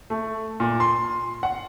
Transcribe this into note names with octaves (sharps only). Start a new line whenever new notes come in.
A3
A#2
C6
F#5